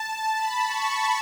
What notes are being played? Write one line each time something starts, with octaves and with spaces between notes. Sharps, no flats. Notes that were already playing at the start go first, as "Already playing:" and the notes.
Already playing: A5
B5
C#6